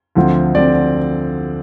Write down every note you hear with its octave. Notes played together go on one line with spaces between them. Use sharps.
D2 D3 F3 C4
D2 D3 F3 C4 D5